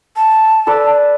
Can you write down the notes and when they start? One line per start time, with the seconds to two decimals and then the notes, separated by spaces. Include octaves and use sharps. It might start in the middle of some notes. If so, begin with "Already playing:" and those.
0.16 A5
0.67 A4 B4 D5